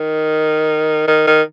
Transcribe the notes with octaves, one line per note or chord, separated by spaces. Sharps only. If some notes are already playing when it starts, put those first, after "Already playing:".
Already playing: D#3
D#3
D#3